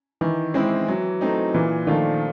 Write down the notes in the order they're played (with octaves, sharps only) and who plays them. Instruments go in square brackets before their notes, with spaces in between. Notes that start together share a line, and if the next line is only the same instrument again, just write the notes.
[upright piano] D#3 [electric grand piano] E3
[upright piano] G#3 C4 E4
F#3
A3 C4 D#4
[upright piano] A#2 [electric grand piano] E3
[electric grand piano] D#3 [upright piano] F3 A3 D4 F4